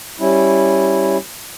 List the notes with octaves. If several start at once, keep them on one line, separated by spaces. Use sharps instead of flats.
G3 C#4 E4